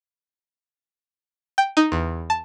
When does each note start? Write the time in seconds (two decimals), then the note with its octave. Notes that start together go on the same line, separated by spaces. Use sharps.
1.58 G5
1.77 D#4
1.92 E2
2.30 A5